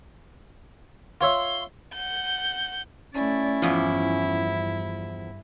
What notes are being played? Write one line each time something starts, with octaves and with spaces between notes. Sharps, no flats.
F4 C#5 E5 C6
F#5 G6
A3 C#4 E4 D5
E2 G2 F3